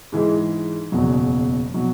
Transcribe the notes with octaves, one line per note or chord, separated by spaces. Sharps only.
G#2 E3 G#3
F#1 E2 B2 F#3
B2 F#3